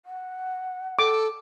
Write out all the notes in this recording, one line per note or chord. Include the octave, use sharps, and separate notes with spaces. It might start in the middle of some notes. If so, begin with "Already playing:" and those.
F#5
A4 D6